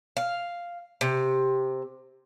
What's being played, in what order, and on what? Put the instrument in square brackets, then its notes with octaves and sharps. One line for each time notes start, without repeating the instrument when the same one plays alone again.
[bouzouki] F5
C3